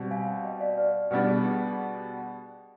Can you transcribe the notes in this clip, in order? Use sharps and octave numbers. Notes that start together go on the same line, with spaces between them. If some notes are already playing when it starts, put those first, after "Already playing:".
Already playing: B2 G3 C4
F5 G#5
D#5 G5
D5 F5
B4 D5
B2 G3 B3 D4 B4
G#4
G4